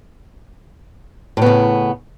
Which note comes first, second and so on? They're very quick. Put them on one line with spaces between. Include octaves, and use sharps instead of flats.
A2 B3 C#3